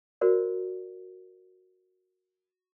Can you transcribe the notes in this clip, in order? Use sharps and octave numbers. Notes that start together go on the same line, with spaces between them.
F#4 A#4 C5 D5